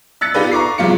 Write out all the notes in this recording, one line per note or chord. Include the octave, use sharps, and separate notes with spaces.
E6 F#6 A6 C#7
D#4 F4 G4 A4 B4 D5
A#5 C#6 D6 C7
F#1 F2 G3 G#3 F4 C#7